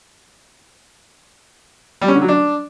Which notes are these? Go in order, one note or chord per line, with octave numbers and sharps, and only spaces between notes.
G3
C#4
D3
F#3
D4